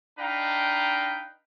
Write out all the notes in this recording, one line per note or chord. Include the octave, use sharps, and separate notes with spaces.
D4 D#4 B4 F5 G5 A#5